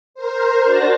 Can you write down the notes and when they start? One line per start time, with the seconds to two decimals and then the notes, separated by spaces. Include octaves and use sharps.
0.14 A#4 C5
0.63 D4 F#4 A5 A#6